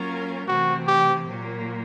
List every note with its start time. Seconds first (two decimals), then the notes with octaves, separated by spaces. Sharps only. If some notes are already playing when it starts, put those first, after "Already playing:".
Already playing: F#3 A#3 C#4 F4 A#4
0.48 C3 E3 A3 C4 F#4
0.87 G4
1.26 A#2 F#3 A#3